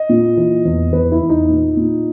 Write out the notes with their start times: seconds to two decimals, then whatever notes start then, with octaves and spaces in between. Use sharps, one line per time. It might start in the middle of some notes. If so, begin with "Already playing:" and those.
Already playing: D#5
0.09 A#2
0.37 E3
0.65 E2
0.92 E2 B4
1.12 E4
1.21 E2
1.29 D#4
1.49 A#2
1.77 A#2